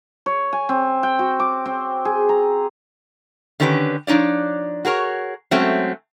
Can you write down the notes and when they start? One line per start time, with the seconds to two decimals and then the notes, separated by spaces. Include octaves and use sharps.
0.26 C#5
0.53 G#5
0.69 C4
1.03 G5
1.19 F#4
1.40 D6
1.65 C4
2.05 G#4
2.29 A#5
3.60 D3 D#3 C#4 G4 G#4 B4
4.07 F3 D4 D#4 C#5 D5
4.85 F#4 G#4 A#4 C#5
5.51 F#3 G#3 A3 C4 C#4